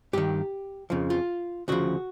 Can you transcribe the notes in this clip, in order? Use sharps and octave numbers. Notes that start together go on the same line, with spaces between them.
G2 D#3 G4
F2 C#3 F3
F4
D2 C#3 F3 F#4